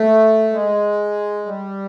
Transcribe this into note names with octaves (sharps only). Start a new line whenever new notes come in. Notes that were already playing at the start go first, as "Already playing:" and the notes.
Already playing: A3
G#3
G3